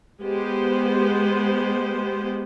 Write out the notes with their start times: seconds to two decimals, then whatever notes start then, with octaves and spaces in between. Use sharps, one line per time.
0.21 G#3 B3 G4 C5